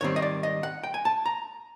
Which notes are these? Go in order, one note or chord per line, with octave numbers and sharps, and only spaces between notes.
G#2 D#3 G3 C4 C#5
D#5
D5
D#5
F#5
G5
G#5
A5
A#5